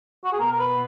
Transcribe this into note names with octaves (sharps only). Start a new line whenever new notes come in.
F#4
G#4
B2 B3 A#4
A#4
B4